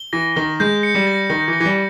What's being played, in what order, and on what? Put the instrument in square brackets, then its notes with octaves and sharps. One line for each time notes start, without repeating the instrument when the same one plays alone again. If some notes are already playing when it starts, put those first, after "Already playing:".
Already playing: [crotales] G7
[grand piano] E3 [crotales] A#6
[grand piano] D#3 [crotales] G7
[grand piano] G#3 [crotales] G6
[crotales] C#7
[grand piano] G3
[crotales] A#6
[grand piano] D#3 [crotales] A#6
[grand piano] E3
[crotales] A#6
[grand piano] E3
G3